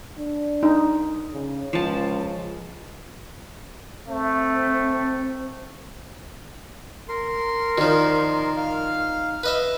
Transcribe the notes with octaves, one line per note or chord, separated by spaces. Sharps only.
D4
D#4
C#3
C#2 F3 A5
A3 C4
A#4 C6
D#3 F3 D#4 D5
F5 F6
B4 D#5 E5